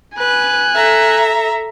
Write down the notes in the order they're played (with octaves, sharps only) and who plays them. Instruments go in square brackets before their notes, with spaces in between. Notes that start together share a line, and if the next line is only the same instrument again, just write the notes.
[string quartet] B4 [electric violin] G#5 F#6
[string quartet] A4 E5 A#5